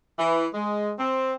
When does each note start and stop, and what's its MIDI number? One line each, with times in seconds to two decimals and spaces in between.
0.17 0.45 52
0.53 0.92 56
0.98 1.33 60